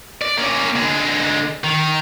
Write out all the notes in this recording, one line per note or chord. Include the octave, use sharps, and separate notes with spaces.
D5
A#3 C#4
D3 G#3
D#3